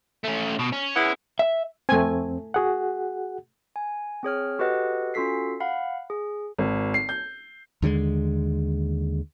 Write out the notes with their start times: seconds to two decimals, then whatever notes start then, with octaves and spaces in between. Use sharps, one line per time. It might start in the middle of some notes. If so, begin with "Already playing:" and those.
0.24 A3 C#4
0.59 B2
0.72 C#4
0.96 G#3 B3 E4
1.39 E5
1.89 F2 A3 C4 G#5
2.54 F#4 G#4 F#5
3.76 G#5
4.23 C4 G#4 C#5 F6
4.59 F#4 G4 A4 B4 D#5 F#5
5.14 C#4 F4 F#4 A4 B6 C7
5.60 F5 F#5 B5
6.10 G#4
6.59 G#1
6.94 C7
7.09 G6
7.82 D#2 D3 D#3 G#3